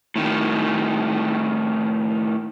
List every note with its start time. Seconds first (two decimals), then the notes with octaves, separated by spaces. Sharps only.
0.16 A2 D#3